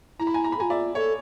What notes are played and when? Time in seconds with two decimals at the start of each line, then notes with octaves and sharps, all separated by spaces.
0.19 E4 A#5
0.27 B5
0.34 G#5 A#5
0.44 A#5
0.52 B5
0.58 F4 A4 G#5 A#5
0.70 D5 E5
0.95 A4 C#5